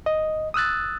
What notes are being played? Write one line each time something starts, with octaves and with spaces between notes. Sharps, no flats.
D#5
D#6 E6 F#6 A6